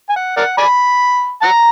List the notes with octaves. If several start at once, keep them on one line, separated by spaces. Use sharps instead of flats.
G#5
F#5
A#4 D5 F#5
D5 G#5 B5
F#5 A#5